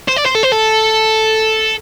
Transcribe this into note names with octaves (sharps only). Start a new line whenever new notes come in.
C5
D5
C5
A4
C5
A4